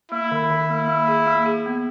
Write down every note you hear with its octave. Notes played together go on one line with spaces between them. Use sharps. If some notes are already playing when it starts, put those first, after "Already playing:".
A#3 E4
D#3
D#3
A#3
A#3
G#4
A#3
G#4
B3